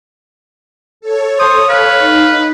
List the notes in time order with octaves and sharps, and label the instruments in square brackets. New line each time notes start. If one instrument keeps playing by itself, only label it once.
[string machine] A4 C#5
[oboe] C5 [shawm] D#6
[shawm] B4 [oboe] F5
[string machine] D#4